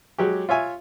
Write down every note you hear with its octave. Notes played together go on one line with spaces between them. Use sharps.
F#3 G#3 G4
F4 C#5 E5 G#5